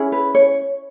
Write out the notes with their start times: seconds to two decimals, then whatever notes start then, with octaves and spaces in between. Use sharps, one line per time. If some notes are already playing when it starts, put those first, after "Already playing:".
Already playing: C#4 E4 G#4
0.12 B4
0.35 C#5